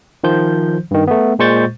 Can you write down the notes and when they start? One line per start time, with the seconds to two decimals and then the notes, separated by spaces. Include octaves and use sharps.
0.24 D#3 F3 C5 G6
0.91 G2 D#3
1.07 A3 B3
1.39 A#2 G#3 C5 C#6 G6 A6